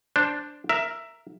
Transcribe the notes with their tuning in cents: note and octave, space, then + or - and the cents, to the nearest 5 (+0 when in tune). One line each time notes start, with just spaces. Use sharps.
D4 +0 C5 +0
A#4 +0 E5 +10